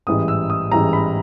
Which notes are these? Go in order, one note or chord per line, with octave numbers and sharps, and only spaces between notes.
A1 G#2 E3 G3 D#6
E6
D#6
A1 G#2 E3 G3 A#5
B5